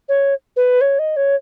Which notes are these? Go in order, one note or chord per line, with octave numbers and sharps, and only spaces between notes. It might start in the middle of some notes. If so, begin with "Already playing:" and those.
C#5
B4
C#5
D#5
C#5